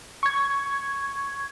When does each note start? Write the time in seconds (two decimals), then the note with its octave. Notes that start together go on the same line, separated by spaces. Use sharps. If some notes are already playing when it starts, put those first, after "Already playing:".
0.23 C#6 G#6